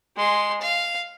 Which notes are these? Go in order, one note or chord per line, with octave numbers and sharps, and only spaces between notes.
G#3 C6
F5